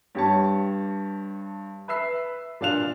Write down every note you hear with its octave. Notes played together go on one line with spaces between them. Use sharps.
G2 G4 C#5 A5
B4 E5 E6 C7
A#2 D4 F5 F#6 F7